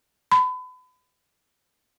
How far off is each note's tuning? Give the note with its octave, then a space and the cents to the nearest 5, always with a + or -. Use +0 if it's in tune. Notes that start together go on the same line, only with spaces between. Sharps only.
B5 +35